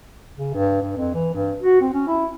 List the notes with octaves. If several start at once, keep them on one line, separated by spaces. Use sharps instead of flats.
C#3
G2
G2
F2
E3
G2
F#4
C4
C#4
E4